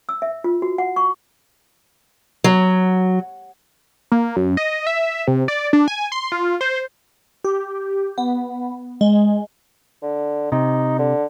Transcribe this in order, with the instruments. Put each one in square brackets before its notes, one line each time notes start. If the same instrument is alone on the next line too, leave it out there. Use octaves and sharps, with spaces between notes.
[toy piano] E6
E5
F4
F#4
F#5
C#6
[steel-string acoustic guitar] F#3
[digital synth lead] A#3
F#2
D#5
E5
C3
D5
D4
G#5
C6
F4
C5
[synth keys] G4
B3
G#3
[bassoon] D3
[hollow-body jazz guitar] C3 [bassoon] D#4
[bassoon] D3